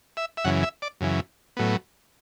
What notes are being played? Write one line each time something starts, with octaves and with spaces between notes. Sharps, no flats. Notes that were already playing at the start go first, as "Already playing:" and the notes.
E5
E5
F#2 C#3 E3 F#5
E5
D5
F#2 C#3 E3
A2 F#3 B3